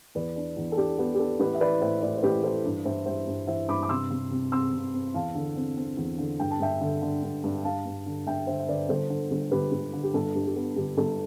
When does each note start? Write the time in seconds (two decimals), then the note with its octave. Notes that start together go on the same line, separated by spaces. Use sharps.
0.15 E2 B4 D5
0.36 D4
0.57 E2
0.72 A4
0.77 D4 G4
0.98 B3 G4
1.15 G4
1.18 D4 A4
1.40 A1 G4 B4
1.55 E5
1.60 E3 B4 D5
1.81 A2 C5 E5
2.02 A2 B4 D5
2.17 C5
2.22 A1 G4 B4
2.43 E3 A4 C5
2.65 G2
2.85 G2 C5 E5
3.06 G3 C5 E5
3.27 G2
3.47 E3 C5 E5
3.68 G2 B5 D6
3.83 D6
3.89 C3 C6 E6
4.10 C3
4.31 C3
4.52 C4 C6 E6
4.73 C3
4.94 C4
5.14 E2 F5 A5
5.35 D3
5.56 C4
5.77 C4
5.97 E2
6.18 D3
6.39 G2 G5
6.51 A5
6.60 G2 E5 G5
6.81 D3
7.02 D3
7.23 G2
7.44 G2
7.64 G2 F5 A5
7.86 G2
8.06 D3
8.27 G2 E5 G5
8.47 D3 C5 E5
8.60 E5
8.68 D3 B4 D5
8.89 G1 A4 C5
9.10 D3
9.31 G1
9.51 G1 G4 B4
9.72 G1
9.93 D3
10.03 G4
10.14 G1 A4
10.35 G2 G4
10.46 G4
10.56 B3 A4
10.76 G1 G4
10.97 G1 A4